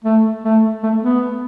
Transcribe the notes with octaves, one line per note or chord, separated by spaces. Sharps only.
A3
A3
A3
B3